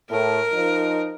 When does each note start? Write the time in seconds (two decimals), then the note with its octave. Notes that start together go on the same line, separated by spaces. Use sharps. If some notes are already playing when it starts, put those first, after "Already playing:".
0.10 A2 A#4
0.53 F3 D#4